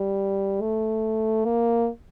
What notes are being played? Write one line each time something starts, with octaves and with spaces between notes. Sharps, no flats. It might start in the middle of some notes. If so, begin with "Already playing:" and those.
Already playing: G3
A3
A#3